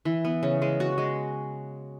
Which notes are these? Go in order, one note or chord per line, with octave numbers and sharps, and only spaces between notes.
E3
B3
C#3
G#3
F#4
G#3